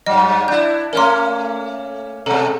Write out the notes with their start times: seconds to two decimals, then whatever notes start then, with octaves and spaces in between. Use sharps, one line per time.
0.06 G2 F#3 D#5
0.48 D4 E4 G6
0.93 A3 A#3 C#4 A#4 C#5 C6
2.26 B2 G#3 A4